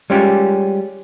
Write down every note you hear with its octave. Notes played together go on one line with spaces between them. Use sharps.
G3 G#3 C#4 F4 G4